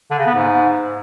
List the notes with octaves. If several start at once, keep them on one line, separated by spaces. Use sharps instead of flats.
D3
C#3
B3
G#2